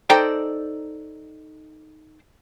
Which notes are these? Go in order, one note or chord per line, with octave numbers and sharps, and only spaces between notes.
D#4 A4 C5 D5 G5 A#5